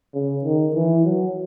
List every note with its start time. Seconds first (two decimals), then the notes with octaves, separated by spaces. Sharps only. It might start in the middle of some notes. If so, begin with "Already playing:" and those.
0.14 C#3
0.44 D#3
0.75 E3
1.05 F#3